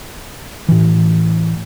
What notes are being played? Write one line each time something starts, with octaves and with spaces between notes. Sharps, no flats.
A2 E3